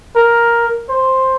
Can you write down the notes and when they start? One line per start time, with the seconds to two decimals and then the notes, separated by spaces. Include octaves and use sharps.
0.16 A#4
0.89 C5